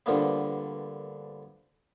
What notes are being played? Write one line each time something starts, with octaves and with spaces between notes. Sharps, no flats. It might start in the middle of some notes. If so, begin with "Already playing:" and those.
G2 D3 F3 A#3 B3